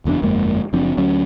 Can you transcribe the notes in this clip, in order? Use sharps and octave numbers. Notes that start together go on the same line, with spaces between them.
F#1 E2 C#3 D4
G1 F2 G#3 A#3
F#1 F3 C4 D4
D2 F#3 C#4